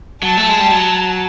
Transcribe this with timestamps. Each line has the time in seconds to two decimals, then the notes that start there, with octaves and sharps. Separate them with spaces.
0.23 F#3 A5
0.38 A3
0.49 G#3
0.60 G3
0.71 F#3